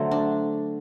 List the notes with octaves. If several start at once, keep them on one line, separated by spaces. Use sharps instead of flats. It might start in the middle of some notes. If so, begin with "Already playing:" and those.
Already playing: D3 F#3 A3 C5
D4